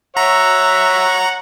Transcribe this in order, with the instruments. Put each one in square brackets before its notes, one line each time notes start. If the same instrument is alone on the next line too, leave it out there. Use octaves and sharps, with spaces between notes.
[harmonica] C#5 F#5 [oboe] E5 [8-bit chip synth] A#5